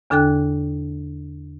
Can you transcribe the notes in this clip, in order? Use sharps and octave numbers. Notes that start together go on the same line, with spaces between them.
E2 D3 D4 A4 G5 F#6